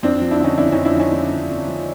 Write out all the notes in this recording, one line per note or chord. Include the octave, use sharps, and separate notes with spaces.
F2 C4 D4
F3
D4 E4
D3 C#4 D#4
F2 D4 E4
F2 C#4 D#4
D4 E4
F3 C#4 D#4
D3
F2
F2
F3